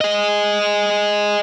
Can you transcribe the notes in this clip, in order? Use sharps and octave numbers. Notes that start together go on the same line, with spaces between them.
G#4 D#5